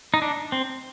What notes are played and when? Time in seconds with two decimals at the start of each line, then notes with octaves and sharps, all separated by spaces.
0.14 D#4
0.22 D4
0.52 C4